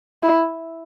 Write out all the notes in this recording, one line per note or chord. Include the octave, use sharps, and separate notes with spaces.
E4